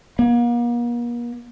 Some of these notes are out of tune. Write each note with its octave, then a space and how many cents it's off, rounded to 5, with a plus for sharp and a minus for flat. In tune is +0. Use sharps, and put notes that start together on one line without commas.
A#3 +40